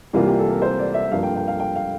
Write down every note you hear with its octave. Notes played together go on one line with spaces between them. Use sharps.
C2 C3 E3 G3 A#3 F4
G4
A4
A#4
C5
D5
E5
G2 F3 A#3 F5
G5
G5
F5
G5
F5